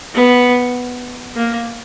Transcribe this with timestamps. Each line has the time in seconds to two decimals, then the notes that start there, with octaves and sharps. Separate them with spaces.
0.14 B3
1.36 A#3